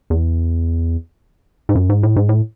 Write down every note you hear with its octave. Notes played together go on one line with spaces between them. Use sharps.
E2
G#2
F#2
G#2
A2
G#2
A2